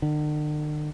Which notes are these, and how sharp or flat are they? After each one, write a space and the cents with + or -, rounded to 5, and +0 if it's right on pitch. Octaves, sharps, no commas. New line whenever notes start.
D3 +45